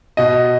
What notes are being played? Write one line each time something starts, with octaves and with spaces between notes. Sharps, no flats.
B2 D#5